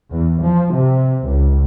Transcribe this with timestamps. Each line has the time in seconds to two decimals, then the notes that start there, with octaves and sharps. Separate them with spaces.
0.12 E2
0.44 F3
0.76 C3
1.26 C#2